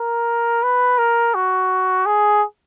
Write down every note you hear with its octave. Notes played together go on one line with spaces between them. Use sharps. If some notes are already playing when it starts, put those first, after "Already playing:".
Already playing: A#4
B4
A#4
F#4
G#4